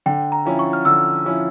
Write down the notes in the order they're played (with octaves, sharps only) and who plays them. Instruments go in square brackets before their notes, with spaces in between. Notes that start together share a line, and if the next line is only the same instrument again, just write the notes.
[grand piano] D3 [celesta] G5
[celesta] A#5
[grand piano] F3 C#4 E4
[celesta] C#6
F6
[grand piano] D3 [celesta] E6
[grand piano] F3 C#4 E4